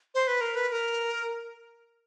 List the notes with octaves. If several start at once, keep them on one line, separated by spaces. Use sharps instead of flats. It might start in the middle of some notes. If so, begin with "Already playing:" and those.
C5
B4
A#4
B4
B4
A#4